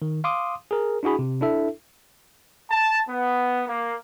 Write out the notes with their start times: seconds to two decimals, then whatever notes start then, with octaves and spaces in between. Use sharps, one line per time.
0.02 D#3
0.24 F5 C6 D6 D#6
0.71 G#4 A#4
1.03 D4 E4 F#4 G#4 B5
1.19 C3
1.41 D4 E4 A4 E5
2.70 A5
3.09 B3
3.67 A#3